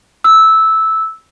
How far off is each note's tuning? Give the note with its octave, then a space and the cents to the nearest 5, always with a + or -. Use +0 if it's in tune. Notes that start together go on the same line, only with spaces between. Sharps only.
E6 -10